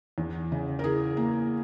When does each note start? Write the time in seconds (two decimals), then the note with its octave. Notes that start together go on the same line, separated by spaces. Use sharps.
0.18 E2
0.52 C#3
0.79 A#4
0.84 E3 G#4
1.17 A#3